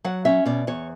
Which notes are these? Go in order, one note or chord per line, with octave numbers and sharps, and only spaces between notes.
F#3 F#5
C#4 E5
B2 D5
E2 C#5